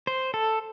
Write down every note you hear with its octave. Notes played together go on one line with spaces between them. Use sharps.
C5
A4